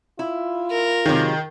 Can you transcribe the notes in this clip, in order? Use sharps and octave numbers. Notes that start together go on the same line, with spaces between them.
E4 F4
A#4
C3 D#3 F#3 G#3